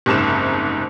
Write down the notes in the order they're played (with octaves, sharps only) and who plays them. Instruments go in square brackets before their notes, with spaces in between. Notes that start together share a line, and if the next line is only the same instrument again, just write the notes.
[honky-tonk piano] F#1 C2 G#2 E7